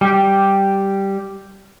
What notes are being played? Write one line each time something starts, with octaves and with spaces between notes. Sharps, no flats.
G3 G4